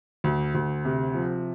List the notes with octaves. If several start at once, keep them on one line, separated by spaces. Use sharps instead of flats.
D2
D2
C3
F3